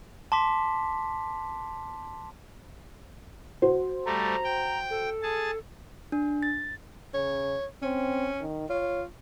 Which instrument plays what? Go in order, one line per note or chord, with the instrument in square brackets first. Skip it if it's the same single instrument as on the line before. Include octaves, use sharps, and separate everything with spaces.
[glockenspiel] A5 C6 D6 B6
[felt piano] F#4 C5
[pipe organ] G3 A3 [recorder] A#5
[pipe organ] G5
[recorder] A4
[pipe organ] G#4 A5
[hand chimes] D4
A6
[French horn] C#3 [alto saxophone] C#5
[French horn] C4 [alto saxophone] C#4
[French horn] D#3
[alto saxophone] F4 [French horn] C#5